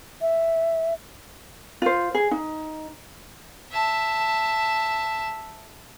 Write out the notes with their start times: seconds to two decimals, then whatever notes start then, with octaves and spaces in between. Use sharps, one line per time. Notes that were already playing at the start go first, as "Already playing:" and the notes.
0.21 E5
1.82 F4 C5
2.15 G#4
2.31 D#4
3.72 E5 A5